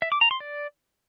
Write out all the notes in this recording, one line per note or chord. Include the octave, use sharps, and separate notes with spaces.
E5
D6
A#5
C6
D5